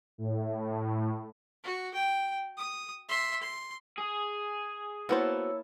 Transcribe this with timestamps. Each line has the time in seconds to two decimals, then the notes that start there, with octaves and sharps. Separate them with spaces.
0.18 A2
1.63 F#4
1.94 G5
2.57 D#6
3.08 E5 C6
3.41 C6
3.98 G#4
5.09 A#3 B3 E4 F#4 C5 C#5 A5 E6